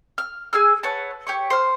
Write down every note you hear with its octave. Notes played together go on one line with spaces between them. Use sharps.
F6
G#4 G#5 E6 F6
B4 C#5 F#5 A5
G4 C#5 C#6
C5 F6